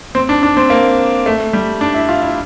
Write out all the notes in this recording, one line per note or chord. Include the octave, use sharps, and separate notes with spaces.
C4
D4
D4
C4
A#3
A3
G3
D4
E4
F4
E4